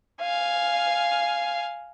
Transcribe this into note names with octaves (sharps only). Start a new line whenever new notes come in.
F5 G#5